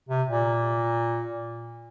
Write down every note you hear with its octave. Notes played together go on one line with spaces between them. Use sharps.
C3
A#2